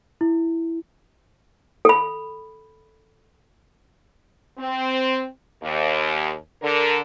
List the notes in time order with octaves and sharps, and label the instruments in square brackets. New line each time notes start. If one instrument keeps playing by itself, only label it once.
[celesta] E4
[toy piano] A4 B5
[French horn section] C4
D#2
D3 A#4